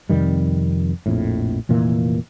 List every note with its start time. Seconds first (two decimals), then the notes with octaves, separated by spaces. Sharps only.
0.09 F2 C3 D#3 G3
1.06 A#1 F2 A2
1.69 F1 A#2 E3 A#3